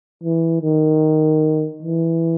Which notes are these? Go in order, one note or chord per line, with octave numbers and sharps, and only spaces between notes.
E3
D#3
E3